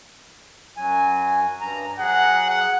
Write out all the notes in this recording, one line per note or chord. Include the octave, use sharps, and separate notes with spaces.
F#2 F#3 G#5
G2 A#5
F#3 G#4 F#5
F#5